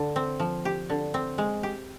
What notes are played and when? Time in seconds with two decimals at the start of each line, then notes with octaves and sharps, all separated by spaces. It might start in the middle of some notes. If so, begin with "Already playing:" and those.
Already playing: D3
0.16 C4
0.40 F3
0.65 G4
0.90 D3
1.14 C4
1.38 G#3
1.63 G4